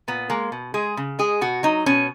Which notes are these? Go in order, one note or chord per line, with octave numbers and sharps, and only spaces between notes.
A#2 B3
G#3 A#3
B2
G#3 G#4
C#3
G#3 G#4
B2 F#4
F#3 D#4
B2 C#4